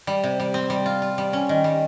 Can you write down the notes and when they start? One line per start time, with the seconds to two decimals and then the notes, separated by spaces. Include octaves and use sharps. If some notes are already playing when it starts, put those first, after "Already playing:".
0.07 G3
0.24 C3
0.40 G3
0.54 C4
0.70 G3
0.86 F4
1.02 F4
1.18 G3
1.33 C#4
1.49 D#3
1.64 G3